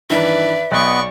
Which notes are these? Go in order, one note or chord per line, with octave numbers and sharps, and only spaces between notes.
G2 D#3 E3 B4 D5 E5
B1 B3 D5 D#5 F#5 C#6